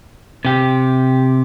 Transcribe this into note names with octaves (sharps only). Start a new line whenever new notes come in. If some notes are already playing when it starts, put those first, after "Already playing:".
C3 G4